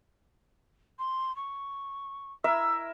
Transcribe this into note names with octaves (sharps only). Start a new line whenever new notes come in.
C6
C#6
E4 A#4 E5 E6